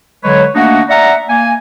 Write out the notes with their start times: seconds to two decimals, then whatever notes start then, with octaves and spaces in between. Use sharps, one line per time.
0.24 D3 F#3 G#3 B4 C#5
0.56 A3 A#3 D4 D#4 F#4 F#5
0.90 D5 E5 F#5 A#5
1.30 A#3 G#5